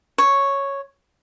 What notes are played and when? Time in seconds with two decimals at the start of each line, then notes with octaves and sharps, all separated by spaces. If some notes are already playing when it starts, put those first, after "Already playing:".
0.18 C#5